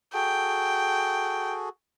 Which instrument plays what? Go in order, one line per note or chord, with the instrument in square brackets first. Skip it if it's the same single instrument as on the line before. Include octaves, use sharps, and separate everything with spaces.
[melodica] F#4 G#4 A4 [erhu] G5